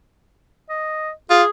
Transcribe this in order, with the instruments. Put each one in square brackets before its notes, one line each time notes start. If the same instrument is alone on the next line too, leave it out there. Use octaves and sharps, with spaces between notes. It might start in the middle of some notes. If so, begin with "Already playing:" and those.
[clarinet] D#5
[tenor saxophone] F4 [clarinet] G#4